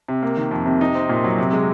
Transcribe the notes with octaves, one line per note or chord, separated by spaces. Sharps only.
C3
A#3
D#3
F2
C3
D#4
C4
A#2
F#3
C3
G#3